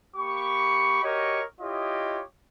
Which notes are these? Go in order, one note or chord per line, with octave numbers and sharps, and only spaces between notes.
A#3 G4 B5 C#6
F#4 G4 A#4 C#5 D#5 C#6
E4 F4 G4 C#5 D#5